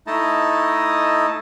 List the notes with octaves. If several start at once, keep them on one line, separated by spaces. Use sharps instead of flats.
A3 D#4 E4 D#5 A5